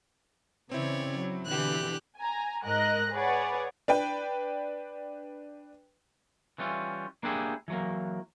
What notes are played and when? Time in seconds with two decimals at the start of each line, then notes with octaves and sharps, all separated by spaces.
0.71 C#3 E3 C4 E4 C#5 D5
1.14 F#3
1.46 B2 D3 E3 G4 F#6
2.18 G#5 A#5
2.64 G#2 A#4 D#5 F#6 A#6
3.13 G#4 B4 C#5 D5 F#5
3.88 D4 B4 G5
6.58 E3 G3 C#4 F4
7.23 A#3 D4 E4 G4 G#4
7.68 E3 F#3 A#3